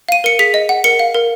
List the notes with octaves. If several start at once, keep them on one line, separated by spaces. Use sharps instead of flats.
F5 D#7
A#4 C#7
G#4 B6
D#5
F#5
A#4 C#7
F5
A#4